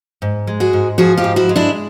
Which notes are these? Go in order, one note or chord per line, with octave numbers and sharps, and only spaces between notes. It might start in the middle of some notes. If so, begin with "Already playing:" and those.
G#2
G#3
F#4 G#4
G#2
F3 F#4 G#4
F4 G4
G#2
E4 F#4
G#3
D4 E4